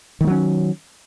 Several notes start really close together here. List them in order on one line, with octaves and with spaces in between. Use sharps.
D#3 A3 F#3 C#4